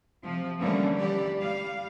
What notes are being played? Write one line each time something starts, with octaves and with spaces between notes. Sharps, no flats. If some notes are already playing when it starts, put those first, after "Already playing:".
C3 F3
D3 E3 G3 A3 A#3 C#4
E3 G4 D5
G3 F5